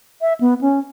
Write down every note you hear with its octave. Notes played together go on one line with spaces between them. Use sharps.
E5
B3
C#4